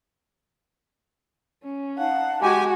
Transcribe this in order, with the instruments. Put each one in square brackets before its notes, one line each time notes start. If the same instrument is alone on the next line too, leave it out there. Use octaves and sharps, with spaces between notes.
[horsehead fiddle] C#4
[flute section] D#4 F5 A5 [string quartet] F#5
[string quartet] G#3 [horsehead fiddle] F#4 [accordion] G4 G#5